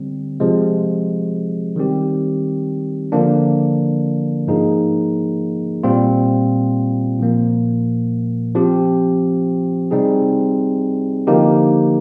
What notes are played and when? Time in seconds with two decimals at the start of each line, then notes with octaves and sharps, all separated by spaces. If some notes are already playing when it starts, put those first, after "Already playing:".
Already playing: D3 G3 C4
0.40 C3 F3 G#3
1.76 D#3 G3 C4 G4
3.12 D3 F3 A#3 D4
4.48 G#2 F3 A#3 D#4 G#4
5.83 A#2 G3 C4 F4
7.19 A#2 F3 A#3
8.55 F3 C4 G4
9.91 C3 G3 C4 D#4 G#4
11.27 D3 F3 A#3 D#4 G4